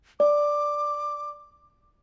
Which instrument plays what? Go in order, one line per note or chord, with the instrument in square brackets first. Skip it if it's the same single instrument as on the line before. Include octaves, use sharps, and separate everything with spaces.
[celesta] D5 [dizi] D6